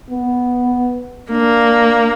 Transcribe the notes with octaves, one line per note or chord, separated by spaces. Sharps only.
B3
A#3 D4